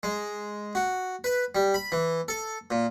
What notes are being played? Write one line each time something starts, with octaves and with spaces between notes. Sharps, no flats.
G#3
F#4
B4
G3
B5
E3
A4
A#2